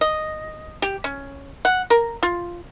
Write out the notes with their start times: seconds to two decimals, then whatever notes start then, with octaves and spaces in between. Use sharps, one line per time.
0.01 D#5
0.82 G4
1.04 C#4
1.65 F#5
1.90 A#4
2.23 F4